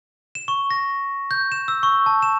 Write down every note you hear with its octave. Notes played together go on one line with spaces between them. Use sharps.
E7
C#6
A#6
G6
E7
E6
C#6
A5
E7